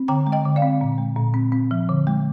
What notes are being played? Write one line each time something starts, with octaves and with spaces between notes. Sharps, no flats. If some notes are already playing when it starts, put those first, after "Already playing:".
Already playing: C4
D3 G5 A#5
G#3
D#5 G5
D3
D5 F5
C4
A#2
G#3
A#2
C4
C4
F3
D3
G#3